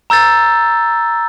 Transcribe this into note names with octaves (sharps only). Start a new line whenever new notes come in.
A#5 E6 G6 A6